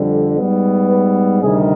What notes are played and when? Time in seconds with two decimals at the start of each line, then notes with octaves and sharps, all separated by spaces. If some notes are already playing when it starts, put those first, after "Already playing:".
Already playing: F2 D3 G3
0.35 G#2 G3 B3
0.88 B4
1.42 D2 C3 D#3 G3 G#4